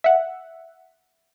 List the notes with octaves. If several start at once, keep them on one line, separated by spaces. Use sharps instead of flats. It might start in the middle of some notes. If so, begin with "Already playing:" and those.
E5 F#5